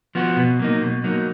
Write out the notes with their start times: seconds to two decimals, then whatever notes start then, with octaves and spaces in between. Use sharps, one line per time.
0.15 F3 B3 F#4
0.37 B2
0.59 F#3 A#3 D#4
0.81 B2
1.04 F#3 A#3 D#4